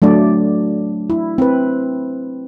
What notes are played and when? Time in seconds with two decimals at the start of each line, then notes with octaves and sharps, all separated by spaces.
0.02 F#3 A3 D4 D5
1.10 E4
1.38 C4 B4